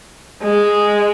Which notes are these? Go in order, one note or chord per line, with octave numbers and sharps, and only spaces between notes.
G#3